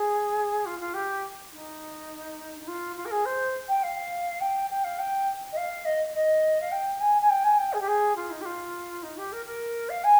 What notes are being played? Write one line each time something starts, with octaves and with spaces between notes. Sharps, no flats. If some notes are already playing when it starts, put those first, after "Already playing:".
Already playing: G#4
F4
F4
G4
D#4
D#4
F4
F4
A#4
G#4
C5
G5
F5
G5
G5
F5
G5
D#5
F5
D#5
D#5
F5
G5
G#5
G#5
G5
G#5
G5
G#4
G4
G#4
F4
D#4
G4
F4
D#4
G4
A#4
A#4
F5
G#5